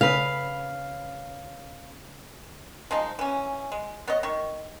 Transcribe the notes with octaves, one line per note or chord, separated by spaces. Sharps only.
C#3 B4 F5
F3 G#3 D#4
E3 C#4
G#3
B3 C#5 D#5
D#3 C#6